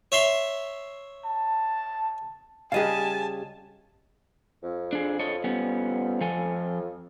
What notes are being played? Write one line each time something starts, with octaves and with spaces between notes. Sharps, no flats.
C#5 E5 C6
A5
C#3 G3 G4 G#4 D#5 F5 G#5 A5
F2
D4 G#4
A4 C#5 D#5
G3 B3 C#4
F3 A4 G#5